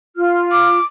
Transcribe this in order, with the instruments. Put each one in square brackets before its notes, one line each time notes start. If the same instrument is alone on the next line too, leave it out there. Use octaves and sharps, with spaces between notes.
[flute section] F4 F6
[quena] D6